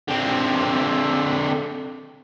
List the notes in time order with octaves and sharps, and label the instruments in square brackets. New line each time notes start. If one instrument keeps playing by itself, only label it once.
[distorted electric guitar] D3 C4